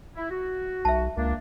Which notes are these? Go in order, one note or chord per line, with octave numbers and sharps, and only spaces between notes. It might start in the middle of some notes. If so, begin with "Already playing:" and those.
E4
F#4
B1 E5 A5
C#2 A#3 D4